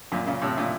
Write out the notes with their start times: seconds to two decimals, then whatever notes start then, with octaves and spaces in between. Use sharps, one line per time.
0.12 F#2 A#2
0.27 A#2 C#3
0.42 A2 C3
0.58 A#2